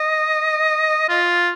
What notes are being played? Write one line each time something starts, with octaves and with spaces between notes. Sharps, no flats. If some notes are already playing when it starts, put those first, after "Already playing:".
Already playing: D#5
F4